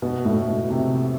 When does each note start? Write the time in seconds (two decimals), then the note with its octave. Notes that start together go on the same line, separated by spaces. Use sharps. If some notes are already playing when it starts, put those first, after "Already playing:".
0.02 B2
0.25 A2
0.47 B2
0.70 C3